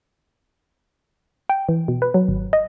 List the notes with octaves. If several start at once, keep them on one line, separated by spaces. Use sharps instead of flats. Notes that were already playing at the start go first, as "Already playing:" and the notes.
G5
E3
B2
B4
F#3
G#1
D#5